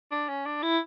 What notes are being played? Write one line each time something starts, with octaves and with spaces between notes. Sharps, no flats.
D4
C#4
D4
E4